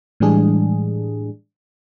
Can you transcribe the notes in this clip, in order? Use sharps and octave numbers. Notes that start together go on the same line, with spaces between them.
A2 E3 G3 G#3 D4 G#4